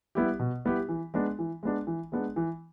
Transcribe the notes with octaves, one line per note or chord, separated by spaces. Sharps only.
G3 B3 E4 G4
B2
G3 B3 E4 G4
E3
G#3 B3 D4
E3
G#3 B3 D4
E3
G#3 B3 D4
E3